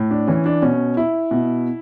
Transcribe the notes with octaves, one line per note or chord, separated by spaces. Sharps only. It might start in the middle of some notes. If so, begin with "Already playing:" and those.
Already playing: A2
D4
E3 C#4
D4
B2 C#4
E4
B2